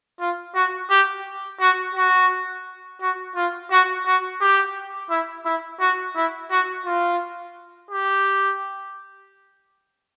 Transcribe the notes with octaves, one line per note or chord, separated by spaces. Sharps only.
F4
F#4
G4
F#4
F#4
F#4
F4
F#4
F#4
G4
E4
E4
F#4
E4
F#4
F4
G4